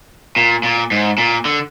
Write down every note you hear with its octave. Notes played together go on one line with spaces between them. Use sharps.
A#2
A#2
G#2
A#2
D3